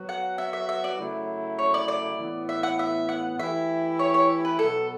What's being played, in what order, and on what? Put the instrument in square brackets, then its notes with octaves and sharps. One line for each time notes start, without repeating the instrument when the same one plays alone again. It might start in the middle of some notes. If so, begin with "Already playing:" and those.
Already playing: [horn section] F#3 B3 F#4
[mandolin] F#5
E5
E5
E5
D5
[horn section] C#3 F#3 A3 E4
[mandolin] C#5
D5
D5
[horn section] A2 E3 B3 E4
[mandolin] E5
F#5
E5
F#5
[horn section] E3 A3 E4 G4 [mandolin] E5
[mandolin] C#5
C#5
B4
[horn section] B2 F#3 B3 [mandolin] A4